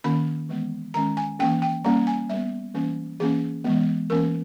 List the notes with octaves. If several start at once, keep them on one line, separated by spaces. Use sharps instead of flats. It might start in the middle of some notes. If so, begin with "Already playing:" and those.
D#3 A#3 C#4 B5
E3 G#3 B3
D#3 G#3 C#4 A#5
G#5
E3 A#3 C#4 G5
G5
G3 A#3 C#4 A#5
G#5
G3 B3 E5
E3 G3 A#3 C#4
E3 A#3 C#4 G#4
E3 G#3 B3
E3 A#3 C#4 A#4